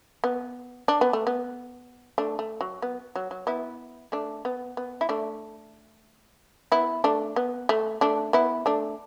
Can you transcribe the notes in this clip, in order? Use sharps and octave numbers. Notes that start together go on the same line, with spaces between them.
B3
D4
B3
A3
B3
A3 D4
A3
F#3
B3
F#3
F#3
B3 E4
A3 D4
B3
B3
E4
A3 D4
B3 E4
A3 D4
B3
A3
A3 D4
B3 E4
A3 D4